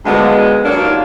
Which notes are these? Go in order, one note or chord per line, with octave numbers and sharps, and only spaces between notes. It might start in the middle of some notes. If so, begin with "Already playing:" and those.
D2 D3 F3 G#3 B3
D#2 D#3 F#3 A#3 D4
F4